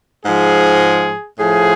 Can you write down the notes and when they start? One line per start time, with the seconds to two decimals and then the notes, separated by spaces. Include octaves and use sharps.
0.24 G#2 F3 G#4
1.38 A2 F3 G#4